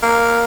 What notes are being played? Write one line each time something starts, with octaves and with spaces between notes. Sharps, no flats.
A#3